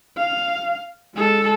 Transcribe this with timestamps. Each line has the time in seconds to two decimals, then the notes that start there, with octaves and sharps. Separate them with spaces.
0.17 F5
1.15 G#3 A4